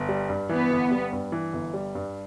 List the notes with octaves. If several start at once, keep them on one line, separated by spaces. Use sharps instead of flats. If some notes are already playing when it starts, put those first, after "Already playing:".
Already playing: G1
G3
G2
E3 B3
G1
G3
G2
E3
G1
G3
G2